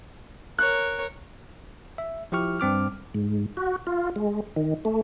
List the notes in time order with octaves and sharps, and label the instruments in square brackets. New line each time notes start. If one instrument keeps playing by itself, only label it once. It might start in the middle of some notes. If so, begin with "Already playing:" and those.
[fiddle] A#4 C#5 [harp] F#6
[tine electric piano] E5
F3 E4 G4 C#6 F6
G2 C4 D6 F6
[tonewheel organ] G#2
F#4
F4
G#3
D#3
A3